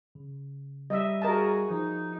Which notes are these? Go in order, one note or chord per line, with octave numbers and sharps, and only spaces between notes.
C#3
G3 D#5 E5
F#4 G#4 A#4 D#5 A5
F3 D#4